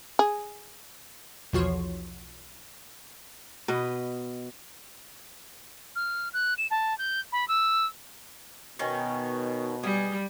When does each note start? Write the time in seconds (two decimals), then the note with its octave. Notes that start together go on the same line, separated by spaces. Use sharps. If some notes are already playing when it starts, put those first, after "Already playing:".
0.19 G#4
1.53 B1 E2 F3 F#4 C#5 C6
3.68 B2 B4 D#5
5.96 F6
6.33 F#6
6.58 E7
6.71 A5
6.98 G6
7.32 B5
7.48 E6
8.79 B2 D#3 C#4
9.83 G3 G#4